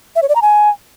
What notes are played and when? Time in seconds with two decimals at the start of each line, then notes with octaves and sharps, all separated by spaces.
0.16 E5
0.22 C#5
0.29 D5
0.35 A#5
0.42 G#5